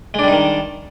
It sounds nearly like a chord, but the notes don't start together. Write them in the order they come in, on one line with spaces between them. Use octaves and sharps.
G#3 D4 G3 D#4 D#3